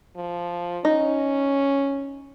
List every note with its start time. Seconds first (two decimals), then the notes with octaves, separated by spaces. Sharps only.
0.16 F3
0.85 C#4 D#4